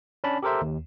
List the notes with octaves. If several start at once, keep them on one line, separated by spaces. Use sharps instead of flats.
C#4 D4 A5 B5
G4 A4 A#4 C5 E5
D#2